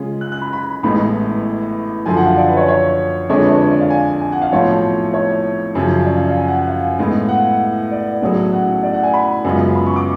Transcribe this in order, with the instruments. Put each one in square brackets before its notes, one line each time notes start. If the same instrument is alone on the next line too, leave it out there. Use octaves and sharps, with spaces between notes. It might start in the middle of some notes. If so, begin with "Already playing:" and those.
Already playing: [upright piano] C#3 G#3 C#4 F4 G#4
[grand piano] F#6
F#6
B5
B5
[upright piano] A1 A2 G#3 B3 [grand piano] B5
[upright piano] F#2 D3 F3 [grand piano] G#5
[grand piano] F#5
F5
D5
B4
C#5
C#5
[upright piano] F2 D3 G#3 D4 G#4 [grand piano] C#5
[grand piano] B4
C#5
C#5
D5
F5
G#5
G#5
F#5
F5
[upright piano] B1 A2 F3 [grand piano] C#5
[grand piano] C#5
[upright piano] F#2 C#3 F3
[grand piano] D5
F5
F5
G#5
F#5
F#5
F5
[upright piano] A2 G#3 B3
[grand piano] F#5
D5
[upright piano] B1 A2 F#3 C#4 G#4
[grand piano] F#5
D5
F#5
G#5
B5
[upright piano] F#2 C#3 G#3 B3 F4
[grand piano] B5
C#6
D6